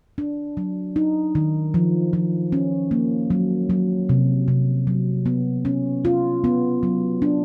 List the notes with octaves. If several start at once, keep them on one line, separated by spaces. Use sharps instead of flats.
D4
F#3
D#4
D#3
F3
F3
C#4
A#3
F#3
F#3
C3
C3
F#3
B3
C#4
F4
B3
F#3
D4